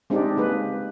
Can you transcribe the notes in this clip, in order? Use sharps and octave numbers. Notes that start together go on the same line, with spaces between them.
G#3 C4 D4 D#4 G4
G#3 A#3 B4